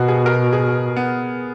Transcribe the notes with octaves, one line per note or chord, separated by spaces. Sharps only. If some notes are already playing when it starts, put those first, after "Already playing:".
Already playing: B2 F#4 A#4
G#4
A#4
G#4
B3